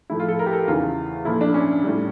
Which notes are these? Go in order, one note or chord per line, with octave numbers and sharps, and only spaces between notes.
A2 F3 A3 E4
F4
A4
A#4
G4
A4
E2 C#3 E3 F4
A#2 F3 A3 E4
D4
C#4
A2 G3